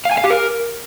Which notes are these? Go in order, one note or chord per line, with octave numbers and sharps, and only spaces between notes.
F5
G#5
F5
G4
A#4